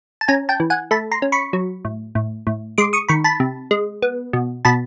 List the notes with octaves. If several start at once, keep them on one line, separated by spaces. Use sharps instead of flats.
A5
C#4 G#5 A#5
G5 A5
E3
F#5 G#5
A3 A5 B5
A#5 C6
C#4
B5 C#6
F#3
A2
A2
A2
G#3 C6 D6
C#6 D#6
D#3 B5 C#6
A5 B5
C3
G#3
B3
B2
B2 A5 B5